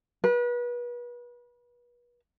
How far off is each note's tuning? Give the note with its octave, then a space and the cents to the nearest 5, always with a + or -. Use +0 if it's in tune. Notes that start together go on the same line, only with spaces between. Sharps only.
B4 -35